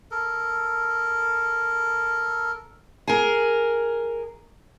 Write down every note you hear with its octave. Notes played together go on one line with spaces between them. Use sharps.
A4 A#4
G#4 A#4